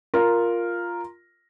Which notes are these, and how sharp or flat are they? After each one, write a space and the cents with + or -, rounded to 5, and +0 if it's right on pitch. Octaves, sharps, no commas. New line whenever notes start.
F4 +0 A#4 +0